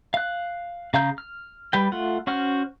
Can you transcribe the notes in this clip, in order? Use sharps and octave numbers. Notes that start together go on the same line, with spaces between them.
F5 F#6
C#3 F5 A#5 G6
F6
G3 B4 G5
A3 F4 F#5
C#4 F#4 C5 F#5 F6